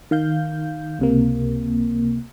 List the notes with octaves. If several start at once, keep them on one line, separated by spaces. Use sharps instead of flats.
D#3 F5 G6
C#2 C3 A#3